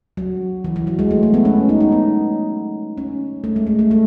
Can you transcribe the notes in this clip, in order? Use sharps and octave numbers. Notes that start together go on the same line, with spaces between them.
F#3
E3
E3
F#3
G#3
A3
A3
B3
C#4
D#4
D#4
B3
C#4
A3
G#3
A3
A3
A3